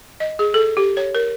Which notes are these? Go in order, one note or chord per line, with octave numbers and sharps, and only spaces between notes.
D#5
G#4
A4
G4
C#5
A#4